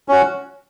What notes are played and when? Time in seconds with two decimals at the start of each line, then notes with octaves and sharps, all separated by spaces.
0.08 C#4 F#4